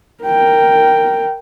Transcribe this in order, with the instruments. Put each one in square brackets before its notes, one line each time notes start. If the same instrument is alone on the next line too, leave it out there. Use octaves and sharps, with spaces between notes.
[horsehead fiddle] A#4 G5